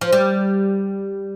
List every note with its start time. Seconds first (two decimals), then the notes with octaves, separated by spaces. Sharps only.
0.01 F3
0.13 G3